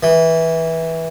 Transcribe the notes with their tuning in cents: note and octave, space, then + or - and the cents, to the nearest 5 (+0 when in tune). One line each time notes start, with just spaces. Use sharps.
E3 -15